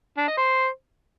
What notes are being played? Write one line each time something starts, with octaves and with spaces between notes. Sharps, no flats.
D4
D#5
C5